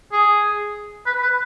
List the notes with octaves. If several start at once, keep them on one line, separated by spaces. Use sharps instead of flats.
G#4
B4
B4